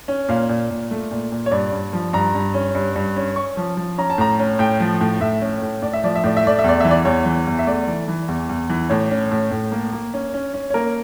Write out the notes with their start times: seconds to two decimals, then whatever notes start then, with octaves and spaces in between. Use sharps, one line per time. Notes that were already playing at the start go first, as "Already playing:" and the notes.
0.08 C#4
0.29 A#2 F5
0.49 A#2
0.70 A#2
0.91 A3
1.11 A#2
1.32 A#2
1.46 C#5
1.51 G2 D5
1.73 G2
1.93 F3
2.13 G2 A#5
2.35 G2
2.54 C#4
2.75 G2
2.96 G2
3.16 C#4
3.36 C#4 C#6
3.57 F3
3.77 F3
3.98 C#4 A#5
4.10 A5
4.18 A2 A#5
4.39 C#4
4.59 A2 G5
4.80 F3
5.01 A2
5.21 A2 E5
5.41 C#4
5.62 A2
5.82 A2 D5
5.93 E5
6.04 F3 D5
6.16 E5
6.24 A2 D5
6.37 E5
6.44 A3 D5
6.59 E5
6.64 E2 D5
6.80 E3 E5
6.91 D5
7.05 E2 C#5
7.25 E3
7.47 E2
7.59 E5
7.67 A3 D5
7.87 E3
8.08 E3
8.28 E2
8.49 E2
8.70 E3
8.89 A2 C#5
9.11 C#4
9.32 A2
9.51 A2
9.71 A#3
9.93 A#3
10.14 C#4
10.34 C#4
10.54 C#4
10.70 C#5
10.74 A#3 A#4